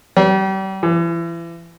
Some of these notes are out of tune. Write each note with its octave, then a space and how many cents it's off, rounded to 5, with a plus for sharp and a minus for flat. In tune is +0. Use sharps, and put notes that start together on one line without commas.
G3 -35
E3 +35